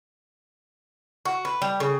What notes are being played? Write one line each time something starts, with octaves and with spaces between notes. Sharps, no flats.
F#4
B4
G3
C#3